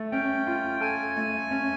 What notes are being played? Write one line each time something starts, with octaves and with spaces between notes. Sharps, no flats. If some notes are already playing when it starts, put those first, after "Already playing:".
Already playing: A3
C#4 G5
F4
A4 G#5
A3
C#4